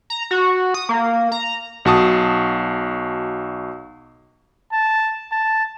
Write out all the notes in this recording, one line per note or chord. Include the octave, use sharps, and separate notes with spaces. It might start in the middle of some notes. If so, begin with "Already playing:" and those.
A#5
F#4
D#6
A#3
A#5
B1 F#4 A5 D#6
A5
A5